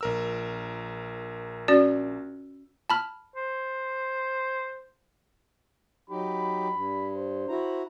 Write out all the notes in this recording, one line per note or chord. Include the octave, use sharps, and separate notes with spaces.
A#1 A#4 E6
C#4 F#4 D5
A5 B5 F6
C5
F#3 D#4 G4 B5
G2
C5
E4 F#4 A#5